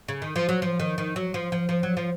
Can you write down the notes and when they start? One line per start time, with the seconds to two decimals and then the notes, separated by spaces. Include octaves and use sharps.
0.08 C#3
0.22 D#3
0.36 F3
0.49 F#3
0.62 F3
0.80 D#3
0.98 D#3
1.16 F#3
1.34 F3
1.52 F3
1.69 F3
1.83 F#3
1.97 F3